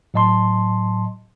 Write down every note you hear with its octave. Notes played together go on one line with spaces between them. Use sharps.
A2 F#3 D#5 A5 C6